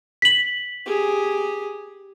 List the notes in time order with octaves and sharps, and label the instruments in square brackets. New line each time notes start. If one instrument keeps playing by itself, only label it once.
[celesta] B6 F#7
[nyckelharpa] G4 G#4